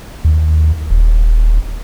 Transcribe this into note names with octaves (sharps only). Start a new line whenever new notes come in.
D#2
D#1